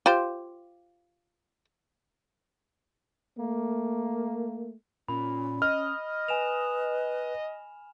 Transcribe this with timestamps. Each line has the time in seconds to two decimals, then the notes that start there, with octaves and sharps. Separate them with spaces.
0.06 F4 G4 C5
3.39 A3 A#3
5.08 A#2 C#4 B5
5.62 D#5 F6
6.28 B4 G#5 E7 F7